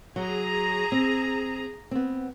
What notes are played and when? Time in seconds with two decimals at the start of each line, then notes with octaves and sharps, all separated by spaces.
0.16 F#3 G#4 A#5
0.92 C4
1.91 B3 C4